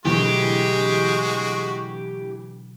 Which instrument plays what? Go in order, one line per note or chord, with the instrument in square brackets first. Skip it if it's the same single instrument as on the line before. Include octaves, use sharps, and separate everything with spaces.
[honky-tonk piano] D2 E3 [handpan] B2 D3 F#3 [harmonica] G#3 F#4 [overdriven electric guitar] G4